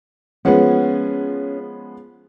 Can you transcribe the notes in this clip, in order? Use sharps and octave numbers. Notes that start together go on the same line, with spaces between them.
F3 G#3 B3 C#4 F#5